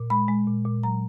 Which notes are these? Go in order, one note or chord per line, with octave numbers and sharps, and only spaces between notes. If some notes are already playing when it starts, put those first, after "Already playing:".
Already playing: A#2
G#3 B5
G#3
A#2
A#2
F#3 A#5